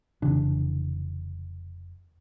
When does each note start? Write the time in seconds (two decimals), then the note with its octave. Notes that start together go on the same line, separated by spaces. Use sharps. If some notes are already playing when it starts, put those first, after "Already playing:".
0.22 F1 C#3 E3 D4